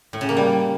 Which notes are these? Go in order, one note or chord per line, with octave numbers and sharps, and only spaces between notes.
A2
C#3
A#3
G3